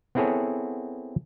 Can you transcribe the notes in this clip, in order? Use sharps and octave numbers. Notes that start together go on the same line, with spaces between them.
B3 C4 E4 G#4 A4 C#5